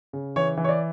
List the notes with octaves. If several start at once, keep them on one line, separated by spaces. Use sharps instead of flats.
C#3
E3 C#5
E3
C#5
D5